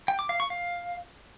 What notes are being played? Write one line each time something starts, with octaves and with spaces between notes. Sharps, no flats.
G5
D6
F5
C#6
F5